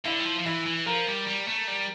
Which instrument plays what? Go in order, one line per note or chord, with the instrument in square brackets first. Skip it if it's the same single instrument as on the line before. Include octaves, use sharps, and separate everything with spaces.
[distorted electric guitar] D3 [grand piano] E4
[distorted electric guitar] G3
F3
F3
[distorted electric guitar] E3 [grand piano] E4
[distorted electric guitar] E3
[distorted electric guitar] F3 [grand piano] A#4
[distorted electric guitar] G3
G3
A3
G3